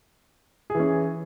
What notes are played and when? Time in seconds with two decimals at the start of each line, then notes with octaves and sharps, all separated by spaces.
0.70 G#4
0.75 E3
0.80 C#4